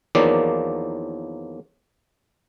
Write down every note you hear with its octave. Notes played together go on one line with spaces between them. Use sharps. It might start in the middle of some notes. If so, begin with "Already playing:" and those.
E2 D#3 F3 F#3 A#3 D5